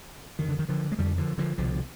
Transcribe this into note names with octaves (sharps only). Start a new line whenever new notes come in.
F2 D3 D#3
D3
D#3
D3 F3
G#3
F2 D3 D#3 G3
D3 F3
D3 F3
C2 B2 D3 F3